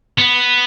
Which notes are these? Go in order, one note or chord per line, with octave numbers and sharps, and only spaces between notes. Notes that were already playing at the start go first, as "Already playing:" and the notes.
B3